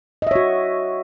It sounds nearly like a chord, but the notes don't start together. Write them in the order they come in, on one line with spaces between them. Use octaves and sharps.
D#5 E5 C#5 F#4